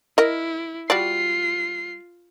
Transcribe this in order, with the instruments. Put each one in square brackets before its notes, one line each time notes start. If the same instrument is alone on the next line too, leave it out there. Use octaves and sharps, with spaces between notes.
[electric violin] E4 [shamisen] A#4 D#5
[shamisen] G3 F#4 D5 [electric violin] F4 C7